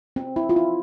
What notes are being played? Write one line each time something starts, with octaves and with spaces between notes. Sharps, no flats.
C4
E4
F4
E4